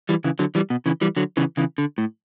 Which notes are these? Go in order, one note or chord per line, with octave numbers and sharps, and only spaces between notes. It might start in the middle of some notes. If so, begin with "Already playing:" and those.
E3 G3
C#3 E3
D3 F#3
E3 G3
B2
C#3 E3
E3 G3
D3 F#3
C#3 E3
C#3 E3
D3
A2